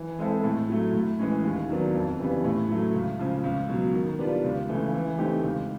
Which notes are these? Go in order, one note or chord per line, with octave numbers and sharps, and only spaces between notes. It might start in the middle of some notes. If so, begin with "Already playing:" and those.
Already playing: E3
G#3 C4 E4 A4
A2
F#3 A3
A2
E3 G#3 C#4
D#2
D#3 F#3 B3 D4
F2
C#3 E3 G3 B3
A2
F#3 A3
C#2
C#3 F3
C#2
B2 F#3
D#3
G3 B3 D4 F4
C#2
C#3 E3 A3
E3
A3 C4 D#4 G4
C#2